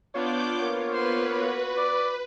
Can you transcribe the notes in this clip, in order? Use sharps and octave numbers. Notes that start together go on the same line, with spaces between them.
B3 D4 F4 C#5 D6 G6
A#3
B4 C5 C6
F#4
D5